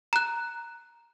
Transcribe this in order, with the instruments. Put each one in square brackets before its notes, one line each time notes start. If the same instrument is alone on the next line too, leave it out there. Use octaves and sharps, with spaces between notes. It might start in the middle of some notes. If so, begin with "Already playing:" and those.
[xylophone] A#5 F#6